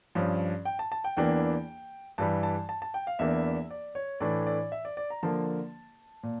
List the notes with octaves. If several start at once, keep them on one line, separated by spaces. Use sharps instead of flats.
G2 F3 C#4
G5
A5
A5
G5
E2 E3 A#3 D4 G5
G2 E3 G3 A5
A5
A5
A5
G5
F5
E2 E3 A#3 D4 E5
D5
C#5
A2 E3 A3 D4 D5
D5
E5
D5
D5
A#5
D3 F3 A#3 A5
A#2